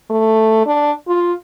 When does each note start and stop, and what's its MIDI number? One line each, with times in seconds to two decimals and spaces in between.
0.10 0.62 57
0.67 0.92 62
1.08 1.33 65